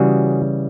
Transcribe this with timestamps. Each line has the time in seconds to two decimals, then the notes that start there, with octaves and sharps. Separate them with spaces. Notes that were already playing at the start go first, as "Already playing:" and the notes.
Already playing: C#3 E3 G3 F#4 G#4